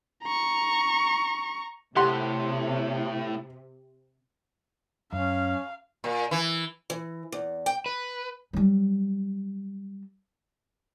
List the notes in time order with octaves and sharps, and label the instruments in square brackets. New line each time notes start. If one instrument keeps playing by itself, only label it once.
[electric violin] A#5 C#6
[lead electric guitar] A2 [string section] C3 [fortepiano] G4 F#5 C6
[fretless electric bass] F#2 [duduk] C#4 [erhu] F5
[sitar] A#2
E3
[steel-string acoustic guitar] E3
E2
G5
[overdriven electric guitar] B4
[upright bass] F#3 G3